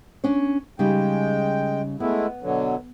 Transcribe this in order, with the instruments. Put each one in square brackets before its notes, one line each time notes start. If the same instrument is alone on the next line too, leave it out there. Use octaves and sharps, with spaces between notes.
[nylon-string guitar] C#4 D4 C#5
[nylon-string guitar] C#3 G3 D#4 [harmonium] G#3 G5
[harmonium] G#3 A3 E4 [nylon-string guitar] B3
[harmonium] B2 D3 F#3